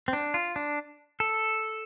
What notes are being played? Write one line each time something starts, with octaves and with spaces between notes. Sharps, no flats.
C4
D4
F4
D4
A4